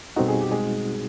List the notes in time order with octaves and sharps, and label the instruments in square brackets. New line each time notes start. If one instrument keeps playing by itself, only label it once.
[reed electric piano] B2 G3 C4 D#4 F#4 [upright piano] A4
[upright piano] G#4
G4
G#3 G#4